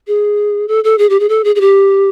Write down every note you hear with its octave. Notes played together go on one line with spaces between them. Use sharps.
G#4
A4
A4
G#4
G4
G#4
A4
G#4
G#4
G4